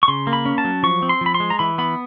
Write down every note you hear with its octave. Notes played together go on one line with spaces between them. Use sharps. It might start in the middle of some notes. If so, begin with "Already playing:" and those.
C#6
C#3 C6
A#3
B5
C#4
A5
F#3
F3 C#6
C4
C6
F3 B5
C6
G#3
A#5
E3 B5
B3 B5